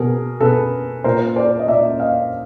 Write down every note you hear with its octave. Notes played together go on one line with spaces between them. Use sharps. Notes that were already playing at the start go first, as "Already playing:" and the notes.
Already playing: B2 G#4 A#4
B2 A4 B4
A#2 A#4 C5
C5 D5
D#5
A#2 D5 E5
D#5 F5